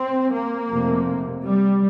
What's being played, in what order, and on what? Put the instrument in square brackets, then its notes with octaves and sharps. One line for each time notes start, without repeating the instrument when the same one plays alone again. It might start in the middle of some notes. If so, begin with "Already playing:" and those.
Already playing: [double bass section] C4
A#3
F1 F2 C3
G3